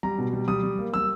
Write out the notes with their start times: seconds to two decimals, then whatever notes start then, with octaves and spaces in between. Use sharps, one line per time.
0.03 G3 A#5
0.18 B2
0.33 G3
0.48 G3 D#6
0.63 G3
0.79 A#3
0.94 G3 E6